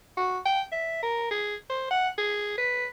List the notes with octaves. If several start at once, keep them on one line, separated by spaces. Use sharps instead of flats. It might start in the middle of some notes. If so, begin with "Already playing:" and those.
F#4
G5
E5
A#4
G#4
C5
F#5
G#4
B4